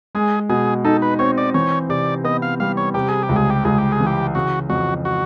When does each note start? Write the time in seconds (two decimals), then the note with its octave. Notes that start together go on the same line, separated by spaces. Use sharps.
0.15 G#3 G#4
0.49 B2 G#4
0.85 D#4 A4
1.02 B4
1.19 C4 C#5
1.38 D5
1.54 E3 C#5
1.89 C3 D5
2.24 B3 D#5
2.42 F5
2.60 G3 F5
2.77 C#5
2.94 C3 G4
3.09 G#4
3.23 G4
3.29 C#2
3.36 G#4
3.50 G4
3.64 C#2 G#4
3.78 G4
3.92 G#4
4.00 E3
4.07 G4
4.35 C#3 F#4
4.70 F2 F#4
5.05 F#4